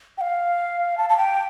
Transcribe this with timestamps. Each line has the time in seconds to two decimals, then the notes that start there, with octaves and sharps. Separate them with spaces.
0.18 G5
0.21 F5
0.98 A5
1.09 A5
1.17 G5